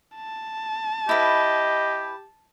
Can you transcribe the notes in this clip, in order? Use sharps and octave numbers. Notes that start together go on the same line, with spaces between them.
A5
E4 G4 B4 D#5